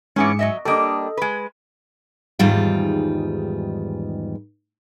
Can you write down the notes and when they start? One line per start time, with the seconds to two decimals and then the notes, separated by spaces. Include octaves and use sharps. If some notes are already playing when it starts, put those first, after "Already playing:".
0.16 G#2 E3 B3 C#4 G#4 C#7
0.39 F#3 D#5 E5
0.65 G3 A#3 D4 A4 D#5
1.17 G#3 B4
2.39 E2 G#2 D#3 G3 F4